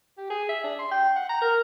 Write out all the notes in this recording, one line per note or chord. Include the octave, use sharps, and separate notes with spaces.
G4
G#4
E5
D4
C6
G5
F#5
A#5
A#4